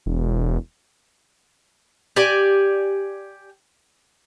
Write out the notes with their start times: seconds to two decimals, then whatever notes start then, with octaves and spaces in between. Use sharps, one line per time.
0.06 E1
2.16 G4 D5 G#5